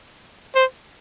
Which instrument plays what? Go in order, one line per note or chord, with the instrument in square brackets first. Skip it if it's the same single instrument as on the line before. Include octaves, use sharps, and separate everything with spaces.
[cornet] C5